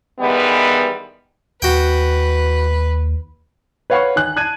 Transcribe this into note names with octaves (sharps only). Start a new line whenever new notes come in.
D#3 E3 G3 G#3 B3
D#2 F#4 B4 G5
B4 C#5 F5 F#5 B5 C#6
D#3 G#5 F#6
A5 F#6 G#6 D#7